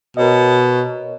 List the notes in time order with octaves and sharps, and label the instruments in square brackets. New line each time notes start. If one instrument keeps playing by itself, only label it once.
[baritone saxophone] B2 [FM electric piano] A#4 C#5 D#5